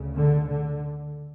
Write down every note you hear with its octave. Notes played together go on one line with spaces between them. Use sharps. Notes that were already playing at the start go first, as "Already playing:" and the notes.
Already playing: D2 C#3
D3
D3